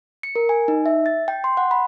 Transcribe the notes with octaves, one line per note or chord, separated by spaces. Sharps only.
C#7
A#4
G#5
D#4
E5
A6
G5
C6
F#5
B5